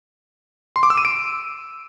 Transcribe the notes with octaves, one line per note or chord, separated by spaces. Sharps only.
C6
D6
E6
D#7
D7